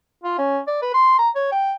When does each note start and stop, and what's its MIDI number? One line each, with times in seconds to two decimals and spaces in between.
0.24 0.38 65
0.38 0.59 61
0.67 0.80 74
0.82 0.94 71
0.94 1.16 84
1.19 1.29 82
1.35 1.51 73
1.52 1.73 79